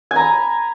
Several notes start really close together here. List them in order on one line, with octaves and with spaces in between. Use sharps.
G#5 A#5 B5